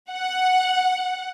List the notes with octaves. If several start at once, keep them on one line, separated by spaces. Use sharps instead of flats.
F#5